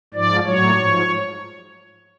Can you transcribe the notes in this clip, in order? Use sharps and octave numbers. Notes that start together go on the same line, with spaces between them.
G#2 F3 D5
A2 F#3 C#5
G#2
F3